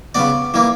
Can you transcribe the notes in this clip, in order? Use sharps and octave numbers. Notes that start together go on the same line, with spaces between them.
C#3 G3 B3 D5
E3 G3 A#3